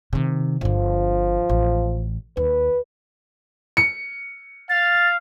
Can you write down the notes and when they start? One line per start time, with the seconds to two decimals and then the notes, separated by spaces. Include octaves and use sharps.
0.13 C3 D#3
0.61 G1 D3 F3
1.49 A1
2.37 D#2 B4
3.77 C#7
4.69 F5 A6